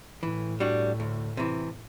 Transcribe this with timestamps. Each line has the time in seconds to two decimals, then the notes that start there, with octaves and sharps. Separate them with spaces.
0.22 A2 E3
0.60 G3 D4 F#4
1.00 D2
1.37 C3 E3